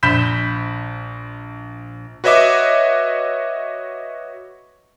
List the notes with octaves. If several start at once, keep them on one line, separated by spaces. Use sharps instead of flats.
A#1 B5 G6 B6 E7
F#4 B4 C#5 D#5 E5 D6